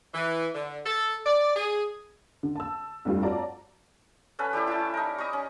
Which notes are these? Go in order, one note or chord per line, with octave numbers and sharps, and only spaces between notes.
E3
D3
A4
D5
G#4
D3
A5 E6
F1 G2 G3 F4
F4 F#4 C#5 D5 A5 A#5
C#4 A4 B4 F#5
G3 A3 E4 G4
E4 A5
D#4 A#4
D#5 A#5 B5 C#6
C#4